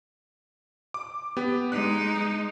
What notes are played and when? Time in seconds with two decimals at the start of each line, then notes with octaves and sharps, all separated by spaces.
0.94 D6
1.37 B3 G4
1.72 G#3 D#4 F#6